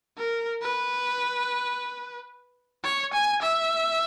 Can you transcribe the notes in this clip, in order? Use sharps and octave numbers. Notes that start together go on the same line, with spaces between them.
A#4
B4
C#5
G#5
E5